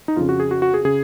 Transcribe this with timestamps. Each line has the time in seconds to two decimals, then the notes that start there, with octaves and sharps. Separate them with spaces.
0.08 D#4
0.16 F2 C#3 F4
0.29 F#4
0.40 G#4
0.51 F#4
0.62 F#4
0.74 G#4
0.85 C#3 G#4